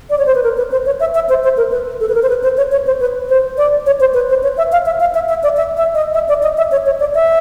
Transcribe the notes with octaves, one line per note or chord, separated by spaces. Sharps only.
D5
C#5
C5
B4
A#4
B4
C5
C#5
E5
E5
C5
C5
A#4
B4
A4
B4
A#4
C5
B4
C5
C#5
C#5
C5
B4
C5
D5
C#5
C5
B4
C5
C#5
E5
F5
E5
F5
E5
E5
D5
E5
E5
D#5
E5
D5
D#5
E5
C#5
C#5
D5
E5